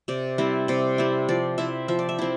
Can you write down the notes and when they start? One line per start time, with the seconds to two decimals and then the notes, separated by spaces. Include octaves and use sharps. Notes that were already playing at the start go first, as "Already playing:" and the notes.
0.08 C3 D5
0.38 G3 C4 E4
0.68 C3 D5
0.98 G3 C4 E4
1.29 F3 D5
1.58 C4 E4 E5
1.88 F3 E5
1.99 D5
2.09 E5
2.19 C4 E4